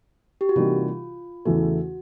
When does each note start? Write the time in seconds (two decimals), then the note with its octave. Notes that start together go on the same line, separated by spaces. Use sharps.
0.41 G4
0.49 F#4
0.56 C3 E3 G3 A#3 D#4 F4
1.45 E2 C#3 E3 A3 F#4